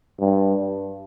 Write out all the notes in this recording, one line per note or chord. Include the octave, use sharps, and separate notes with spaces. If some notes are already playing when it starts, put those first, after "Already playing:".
G2